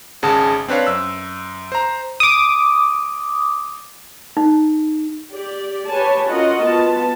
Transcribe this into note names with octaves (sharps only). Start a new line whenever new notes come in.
G#1 C#3 G#4 F#5 A5
C4 D4 B4 C#5 F5
F#2 E6
C5 A#5
D6 D#6
D#4
G4 D5
G4 B4 C#5 G#5 A5
C#4 F4 F#4 A#4 D#5 F#5
B3 F4 A5